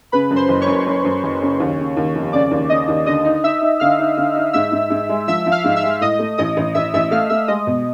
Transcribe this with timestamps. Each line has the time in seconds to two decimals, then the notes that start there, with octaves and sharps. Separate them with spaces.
0.12 C#3 B4 B5
0.31 F#2
0.36 C5 C6
0.48 F#1
0.61 C#5 C#6
0.67 F#2
0.86 F#2
1.05 F#2
1.23 F#1
1.42 C#3
1.60 D#2
1.78 C#3
1.97 D#2
2.15 F1
2.33 C#3 D5 D6
2.51 D#2
2.69 C#3 D#5 D#6
2.88 D#2
3.06 D3 D#5 D#6
3.25 D#4
3.44 D#4 E5 E6
3.61 D#4
3.80 D3 F5 F6
3.99 D#4
4.17 D3
4.36 D#4
4.53 G#2 E5 E6
4.72 G#2
4.90 G#2
5.09 G#3
5.28 F3 E5 E6
5.46 F3
5.52 F5 F6
5.64 G#2
5.76 E5 E6
5.83 G#3
6.01 A2 D#5 D#6
6.19 A3
6.38 A1 D#5 D#6
6.57 A1
6.75 A1 E5 E6
6.94 A1 E5 E6
7.11 A3 F5 F6
7.30 A3 E5 E6
7.48 G#3 D#5 D#6
7.67 B2